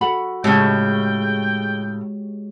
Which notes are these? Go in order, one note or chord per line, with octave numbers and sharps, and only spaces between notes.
F#4 A4 F#5 B5
A2 C#3 G#3 G4 C#5 G5